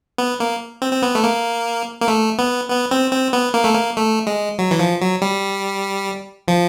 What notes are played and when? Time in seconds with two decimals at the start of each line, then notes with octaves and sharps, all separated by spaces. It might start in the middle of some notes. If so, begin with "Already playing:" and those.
0.18 B3
0.40 A#3
0.82 C4
0.93 C4
1.02 B3
1.15 A3
1.24 A#3
2.01 A#3
2.08 A3
2.39 B3
2.70 B3
2.91 C4
3.13 C4
3.33 B3
3.54 A#3
3.64 A3
3.75 A#3
3.96 A3
4.27 G#3
4.58 F#3
4.71 E3
4.79 F3
5.00 F#3
5.22 G3
6.48 F3